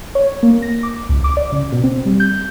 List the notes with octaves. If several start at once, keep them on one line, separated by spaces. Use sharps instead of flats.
C#5
A#3
A#6
D6
C#2
D6
D5
C#3
B2
C4
G3
G6